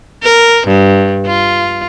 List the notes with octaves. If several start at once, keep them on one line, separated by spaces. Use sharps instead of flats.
A#4
G2
F4